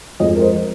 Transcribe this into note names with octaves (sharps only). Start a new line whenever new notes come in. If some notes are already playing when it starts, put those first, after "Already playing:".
F2 F3 G#3 D#5
A#4
C5